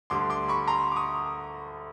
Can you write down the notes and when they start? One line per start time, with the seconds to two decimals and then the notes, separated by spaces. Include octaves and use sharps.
0.10 D2 D3 G3 C6 D6
0.30 C6 D6
0.48 B5 C#6
0.67 A#5 C6
0.92 D6
0.96 C#6 D#6